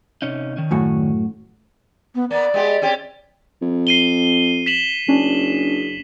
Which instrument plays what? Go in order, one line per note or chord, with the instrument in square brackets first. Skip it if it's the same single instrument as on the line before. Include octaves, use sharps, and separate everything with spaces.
[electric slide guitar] C3 C#4 D#4
D#3 C#4
[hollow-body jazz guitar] F#2 A2 F#4
[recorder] B3
[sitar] A#3 B3 [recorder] D5
[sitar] G#3 B3 G4
C4 C#4 G4
[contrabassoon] F2
[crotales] C7 D#7 G7
B6 E7 F#7
[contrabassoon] F#1 [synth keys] C#4 D4